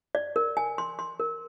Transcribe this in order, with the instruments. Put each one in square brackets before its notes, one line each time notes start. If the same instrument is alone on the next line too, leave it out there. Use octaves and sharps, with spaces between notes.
[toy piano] D5
A#4
G#5
C6
C6
A#4